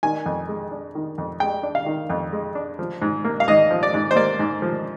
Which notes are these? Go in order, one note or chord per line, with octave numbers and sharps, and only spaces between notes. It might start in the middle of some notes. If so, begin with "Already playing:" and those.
D#3 G#5
F2
G#3
D4
D#3
F2
G#3 G5
D4
F5
D#3
F2
G#3
D4
F3
G#2
A#3
F5
G#2 D#5
F3
D5
G#2
C5
A#3 D5
G#2
F3